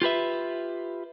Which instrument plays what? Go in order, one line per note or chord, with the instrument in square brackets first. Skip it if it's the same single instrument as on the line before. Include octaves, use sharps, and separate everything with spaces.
[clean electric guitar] F4 G4 B4 E5